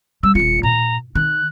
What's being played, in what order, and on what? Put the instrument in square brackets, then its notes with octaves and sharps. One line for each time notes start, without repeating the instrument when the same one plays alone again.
[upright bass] G3 [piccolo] E6
[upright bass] D#1 F4 [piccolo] C#7
[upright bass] A#2 [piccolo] A#5
[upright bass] D#3 [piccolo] F#6